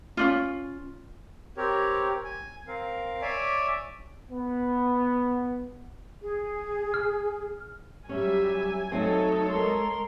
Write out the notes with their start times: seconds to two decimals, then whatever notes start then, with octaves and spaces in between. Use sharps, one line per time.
0.17 C#4 D4 F4
1.57 C4 G4 A#4 C#5
2.25 G#5
2.68 C4 A#4 F5
3.22 C#5 D5 E5 G#5 D6
4.31 B3
6.21 G#4
6.94 F6
8.09 F#3 G3 C#4 G4 E5 G#5
8.92 F#3 A3 C4 D#4 A4 C#5 D#5
9.50 G#3 A#4 C6